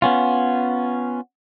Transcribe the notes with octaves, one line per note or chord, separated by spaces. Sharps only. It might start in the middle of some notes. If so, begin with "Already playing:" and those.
B3 C#4 F4